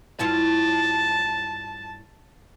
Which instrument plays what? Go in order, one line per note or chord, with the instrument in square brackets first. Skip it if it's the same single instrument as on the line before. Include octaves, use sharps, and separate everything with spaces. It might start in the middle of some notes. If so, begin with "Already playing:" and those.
[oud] G2 E4 F4 [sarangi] A5